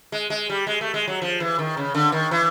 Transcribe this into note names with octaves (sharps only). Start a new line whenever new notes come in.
G#3
G#3
G3
G#3
A3
G#3
F#3
F3
E3
D#3
C#3
D3
D#3
E3